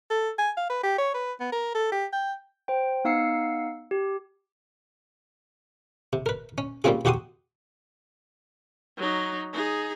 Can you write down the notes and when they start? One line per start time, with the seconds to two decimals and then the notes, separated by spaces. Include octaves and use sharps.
0.10 A4
0.39 G#5
0.57 F5
0.70 B4
0.83 G4
0.99 C#5
1.15 B4
1.41 B3
1.52 A#4
1.75 A4
1.92 G4
2.13 G5
2.68 C5 G5
3.05 B3 D#4 F5 E6 C7 C#7
3.91 G4
6.13 C3
6.26 A#4 B4
6.58 C#4
6.84 G3 A#3 C4 C#4 F4 G#4
7.05 E2 F#4 G4 F#5 C6 D#6
8.97 F#3 D#4
9.53 D#4 G#4